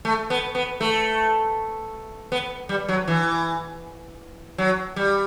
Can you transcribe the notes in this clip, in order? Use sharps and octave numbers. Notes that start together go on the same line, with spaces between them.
A3
B3
B3
A3
B3
G3
F#3
E3
F#3
G3